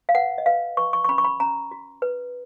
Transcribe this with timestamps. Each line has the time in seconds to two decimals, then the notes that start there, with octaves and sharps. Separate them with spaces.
0.09 F5
0.15 B4 F#5
0.38 D#5
0.46 B4 F5
0.77 B4 C#6
0.93 C#6
1.04 C#6
1.09 C#4 B5
1.18 C#6
1.24 B5
1.40 C#4 A#5
1.71 F#4
2.02 B4